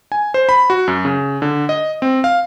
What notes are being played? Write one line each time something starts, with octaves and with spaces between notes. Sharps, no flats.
G#5
C5
B5
F#4
F#2
C#3
D3
D#5
C4
F5